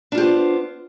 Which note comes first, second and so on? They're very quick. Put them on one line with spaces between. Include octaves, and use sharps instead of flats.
D4 F4 G4 C5 B3